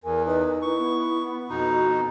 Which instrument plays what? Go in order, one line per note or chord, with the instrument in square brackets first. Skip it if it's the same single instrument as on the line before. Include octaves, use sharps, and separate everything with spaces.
[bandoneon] E2 [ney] A#4 [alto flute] G#5
[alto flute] D#4 [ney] B4
[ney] E4 [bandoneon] C#6
[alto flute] B3
[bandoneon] F2 B2 D#4 [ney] F#4